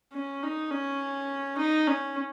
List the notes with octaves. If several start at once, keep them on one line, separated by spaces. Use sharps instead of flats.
C#4
D#4
C#4
D#4
C#4